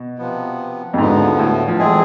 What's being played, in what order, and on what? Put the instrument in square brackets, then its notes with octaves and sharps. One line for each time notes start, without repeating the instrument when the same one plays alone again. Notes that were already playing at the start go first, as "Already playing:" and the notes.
Already playing: [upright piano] B2
[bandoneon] C3 F3 B3
[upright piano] F2
[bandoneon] D2 D3 F3 B3 [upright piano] G#2
[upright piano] A2
F3
[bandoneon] E2 B2 A3 C4 G#4 [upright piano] G#3